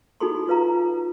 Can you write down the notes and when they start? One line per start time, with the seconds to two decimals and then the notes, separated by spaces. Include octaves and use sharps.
0.20 D#4 F#4 G#4 A4 B5 C6
0.48 F4 B4 F5 A#5